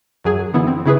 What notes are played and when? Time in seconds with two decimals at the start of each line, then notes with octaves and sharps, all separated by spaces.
0.24 F#2 F#3 G#4
0.53 D3 E3 B3 E4
0.67 C4
0.86 C#3 E4 G#4 B4